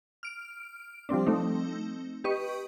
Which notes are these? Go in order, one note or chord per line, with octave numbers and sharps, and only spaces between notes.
F6 D7
F3 G3 C4 D4
A3 C4 D#4
G4 B4 D#5 C#6